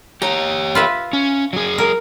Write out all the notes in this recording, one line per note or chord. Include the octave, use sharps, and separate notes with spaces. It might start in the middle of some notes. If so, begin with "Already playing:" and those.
G4 C#5 A#5
F4 B4 E5
C#4
F#3 G#4
A#4